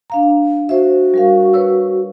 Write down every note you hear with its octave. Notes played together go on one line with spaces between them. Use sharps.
D4 F5 A#5
F#4 C5 E5
G3 A#4 F5
B4 C#5 E6